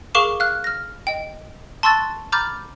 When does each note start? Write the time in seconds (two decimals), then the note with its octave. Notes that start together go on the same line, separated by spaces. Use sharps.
0.15 G#4 A#4 F5 C#6 D6 E7
0.40 F5 F6 F#6
0.64 F6 A#6
1.07 D#5 G5
1.83 A5 C6 C#6 E6 F#6 A6
2.32 A#5 B5 D6 F6 G6 A6